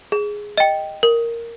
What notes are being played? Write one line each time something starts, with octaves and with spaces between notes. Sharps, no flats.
G#4
D#5 G5
A#4